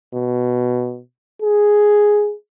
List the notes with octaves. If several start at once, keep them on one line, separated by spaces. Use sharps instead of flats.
B2
G#4